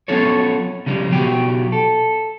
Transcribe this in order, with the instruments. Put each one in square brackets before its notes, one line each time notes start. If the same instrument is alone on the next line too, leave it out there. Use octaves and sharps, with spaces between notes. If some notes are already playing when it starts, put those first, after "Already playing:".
[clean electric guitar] F#3 B3 C#4 F4 A4 C#5
C#3 F3 G3
B2 F#3 G4
A4